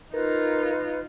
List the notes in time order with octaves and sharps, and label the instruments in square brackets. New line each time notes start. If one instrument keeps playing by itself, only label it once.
[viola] D#4 F4 [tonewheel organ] A#4 [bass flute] B4